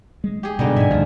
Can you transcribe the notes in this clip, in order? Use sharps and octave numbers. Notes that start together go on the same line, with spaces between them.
G#3
G4 G#4
G2 B2 D3 D#4
G#2 E5 G#5
D2 G2 C3 F3